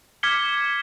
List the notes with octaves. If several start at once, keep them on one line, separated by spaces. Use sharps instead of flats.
D6 F6 G#6 B6 C#7 G7